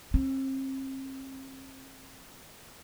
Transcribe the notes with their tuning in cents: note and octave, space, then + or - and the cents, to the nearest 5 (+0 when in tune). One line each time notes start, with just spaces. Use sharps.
C4 +40